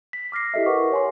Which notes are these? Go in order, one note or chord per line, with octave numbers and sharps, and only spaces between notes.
B6
D6 F6 A#6 C7
E4 G4 A4 D#5 E5
A#4 B4 F#5 C#6 D6
C#5 G#5 C6